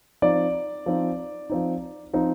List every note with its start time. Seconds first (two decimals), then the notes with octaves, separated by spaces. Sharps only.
0.22 F3 C4 D#4 D5
0.86 F3 C4 D#4
1.50 F3 C4 D#4
2.13 F3 C4 D#4